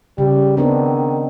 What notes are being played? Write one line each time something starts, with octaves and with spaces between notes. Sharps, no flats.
C#3 G3
D#3 B3 C4 D4